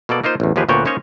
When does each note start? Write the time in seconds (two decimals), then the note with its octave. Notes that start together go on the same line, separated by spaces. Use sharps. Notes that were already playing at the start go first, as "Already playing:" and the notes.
0.09 B2 A#3 A4 D5
0.24 A#3 D#4 F4 C5
0.40 A1 E2
0.56 D#2 F3 G4 G#4 B4
0.69 D2 A#2 B3 F#4 C#5 G5
0.85 A#3 C#4 D#4 C5 C#5 D#5